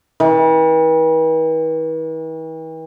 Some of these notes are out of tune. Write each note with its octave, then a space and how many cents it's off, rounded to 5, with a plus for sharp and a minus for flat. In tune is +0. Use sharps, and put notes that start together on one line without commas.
E3 -45